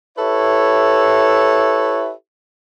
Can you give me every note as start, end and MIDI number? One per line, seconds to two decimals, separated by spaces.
0.18 2.13 64
0.18 2.13 67
0.18 2.13 69
0.18 2.13 71
0.18 2.13 73
0.18 2.13 76